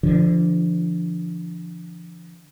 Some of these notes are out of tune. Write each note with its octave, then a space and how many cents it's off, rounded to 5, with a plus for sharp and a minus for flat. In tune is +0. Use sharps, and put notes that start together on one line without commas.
D3 +0 F3 -30